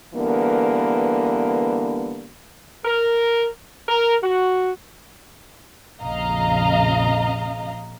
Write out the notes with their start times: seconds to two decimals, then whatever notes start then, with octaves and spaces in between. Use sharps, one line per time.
0.15 D3 E3 G3 A#3 B3 A#4
2.85 A#4
3.89 A#4
4.23 F#4
6.01 A#1 F2 C#3 D#5 F5 A#5